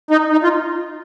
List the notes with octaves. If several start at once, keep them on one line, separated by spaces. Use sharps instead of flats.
D#4
D#4
F4